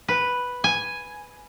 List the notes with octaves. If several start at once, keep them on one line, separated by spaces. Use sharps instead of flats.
B4
G#5